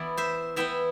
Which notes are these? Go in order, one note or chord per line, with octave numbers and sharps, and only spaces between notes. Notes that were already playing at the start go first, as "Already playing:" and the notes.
Already playing: E3 B3 E4 D5
C5 E5
E3 B3 E4 E5 G5